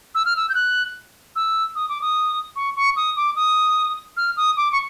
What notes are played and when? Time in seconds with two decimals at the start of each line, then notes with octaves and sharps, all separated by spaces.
0.15 E6
0.25 F6
0.36 E6
0.49 G6
0.55 F#6
1.36 E6
1.75 D#6
1.89 D6
2.01 D#6
2.56 C#6
2.76 C#6
2.96 D#6
3.16 D6
3.36 D#6
4.17 F6
4.37 D#6
4.57 D6
4.72 C#6